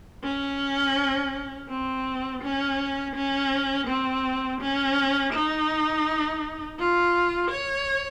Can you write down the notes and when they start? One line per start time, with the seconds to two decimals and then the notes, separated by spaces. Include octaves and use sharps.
0.24 C#4
1.69 C4
2.42 C#4
3.15 C#4
3.87 C4
4.61 C#4
5.33 D#4
6.79 F4
7.51 C#5